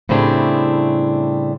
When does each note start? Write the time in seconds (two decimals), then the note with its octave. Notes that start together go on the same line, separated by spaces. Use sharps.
0.09 A2 C#3 G3 C4 D4 E4